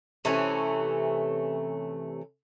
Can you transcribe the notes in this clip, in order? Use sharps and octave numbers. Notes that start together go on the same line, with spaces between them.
C3 E3 A3 C#4